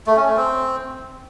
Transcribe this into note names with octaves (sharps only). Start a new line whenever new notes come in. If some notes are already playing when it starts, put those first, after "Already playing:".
A3
C#4
A3
C4